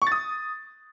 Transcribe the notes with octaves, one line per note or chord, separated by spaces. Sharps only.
C#6
A6
D#6